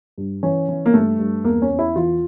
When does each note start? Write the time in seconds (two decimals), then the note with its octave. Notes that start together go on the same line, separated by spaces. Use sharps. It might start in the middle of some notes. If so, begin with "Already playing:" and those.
0.18 G2
0.43 E3 C#4
0.69 E3
0.86 A#3
0.94 G2 A3
1.19 G2
1.44 E2 A#3
1.62 C#4
1.70 E2
1.79 E4
1.96 E3 F4